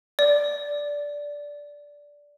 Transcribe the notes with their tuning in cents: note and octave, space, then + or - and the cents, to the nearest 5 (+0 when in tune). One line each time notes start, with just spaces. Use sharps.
D5 -10